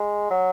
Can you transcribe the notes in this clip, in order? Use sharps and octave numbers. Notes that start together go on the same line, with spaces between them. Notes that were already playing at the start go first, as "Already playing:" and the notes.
Already playing: G#3
F#3